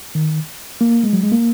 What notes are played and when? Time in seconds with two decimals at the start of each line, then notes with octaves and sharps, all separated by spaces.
0.15 D#3
0.81 A#3
1.04 G#3
1.13 F#3
1.23 G#3
1.32 A#3